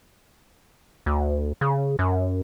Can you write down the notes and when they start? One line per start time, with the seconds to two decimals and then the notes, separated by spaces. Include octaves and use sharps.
1.06 D2
1.61 C#3
1.99 F#2